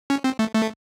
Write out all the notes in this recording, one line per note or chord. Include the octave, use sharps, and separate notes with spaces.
C#4
C4
A3
A3